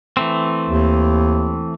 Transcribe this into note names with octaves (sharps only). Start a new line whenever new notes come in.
E3 A3 C4
D#2